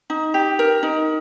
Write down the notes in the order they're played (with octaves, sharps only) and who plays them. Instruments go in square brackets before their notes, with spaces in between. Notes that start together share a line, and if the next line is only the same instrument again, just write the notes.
[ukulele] D#4
G4
A#4
D#4